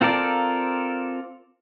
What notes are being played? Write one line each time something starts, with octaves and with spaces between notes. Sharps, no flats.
C4 F4 A4 A#4 D5